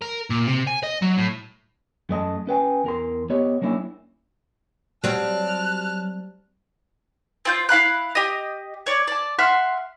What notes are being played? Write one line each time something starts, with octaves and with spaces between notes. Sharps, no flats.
A#4
A#2
C3
G#5
D#5
F#3
A2
F#2 A3 D#5 A5
C#4 B4 G5 G#5
E2 A#4 C6
B3 G4 C#5 D#5
F#3 A#3 C#4 D4 E4
F#3 G3 C4 A5 F6 F#6
C4 F4 G6
E4 F5 B5 F#6
G4 D#5
C#5 D5
D5 A5
E5 F#5 C6 F6